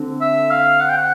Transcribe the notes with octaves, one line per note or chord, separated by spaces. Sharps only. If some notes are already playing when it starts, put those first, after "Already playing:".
Already playing: D3 C4
E5
F5
F#5
G5
F#5